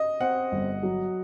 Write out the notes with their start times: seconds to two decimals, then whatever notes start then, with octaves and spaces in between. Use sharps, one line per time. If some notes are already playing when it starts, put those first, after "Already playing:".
Already playing: D#5
0.20 C4 F#5
0.52 G1
0.83 F#3